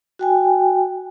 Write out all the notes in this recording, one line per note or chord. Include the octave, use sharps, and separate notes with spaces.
F#4 G5 G#5